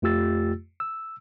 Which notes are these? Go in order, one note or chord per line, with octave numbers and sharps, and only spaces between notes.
F2 A3 F4 G4 E6 A6
E6